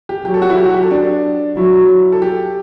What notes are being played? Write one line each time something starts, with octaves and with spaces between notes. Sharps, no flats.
G4
F#3 G4
A4
F#4
E4
G4
F#4
G4
A4
D4
F#3 E4
A4
G4